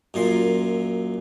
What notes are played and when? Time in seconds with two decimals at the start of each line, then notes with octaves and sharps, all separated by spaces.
0.14 F#2 A#2 C6